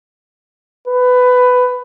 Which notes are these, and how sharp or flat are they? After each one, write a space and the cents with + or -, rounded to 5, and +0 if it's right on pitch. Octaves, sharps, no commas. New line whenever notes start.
B4 +15